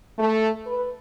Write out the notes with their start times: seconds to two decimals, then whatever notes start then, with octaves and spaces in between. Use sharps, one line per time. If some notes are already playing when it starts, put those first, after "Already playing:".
0.18 A3
0.67 B4